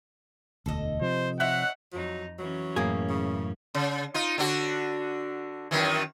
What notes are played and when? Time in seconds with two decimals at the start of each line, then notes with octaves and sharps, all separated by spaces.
0.66 E1 D2 A4 D#5
1.01 C3 F3 C5
1.40 C4 D#4 C#5 E5 F#5 F#6
1.92 F2 F#3 D#4
2.38 E3 F#3 C#4
2.76 F#2 A2 A#3 G#4
3.09 C#3
3.75 C#3
4.14 D#4 F4
4.38 D3 D4 F#4
5.71 F#2 D#3 E3